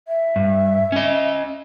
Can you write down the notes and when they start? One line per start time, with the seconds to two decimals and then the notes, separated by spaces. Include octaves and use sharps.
0.08 E5
0.36 G2
0.92 C#4 D#5